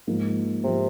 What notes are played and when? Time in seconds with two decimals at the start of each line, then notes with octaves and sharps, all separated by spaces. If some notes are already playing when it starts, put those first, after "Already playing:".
0.07 G#2 F3 A#3
0.64 G#2 C3 F3 A#3